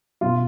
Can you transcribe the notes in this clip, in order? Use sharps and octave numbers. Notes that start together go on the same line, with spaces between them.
B2 F4